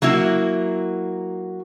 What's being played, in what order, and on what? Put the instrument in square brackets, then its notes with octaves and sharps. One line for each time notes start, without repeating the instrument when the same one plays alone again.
[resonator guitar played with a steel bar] F#3 A#3 E4 F#4